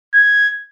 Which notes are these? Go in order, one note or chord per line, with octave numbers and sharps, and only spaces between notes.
G#6